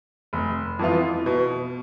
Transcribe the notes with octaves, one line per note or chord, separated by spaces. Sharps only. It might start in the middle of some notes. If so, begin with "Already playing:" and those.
F1
F2 E3 B3 F4
B2